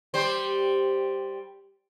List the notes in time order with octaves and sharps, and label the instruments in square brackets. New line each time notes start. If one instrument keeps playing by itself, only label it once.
[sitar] G3 C5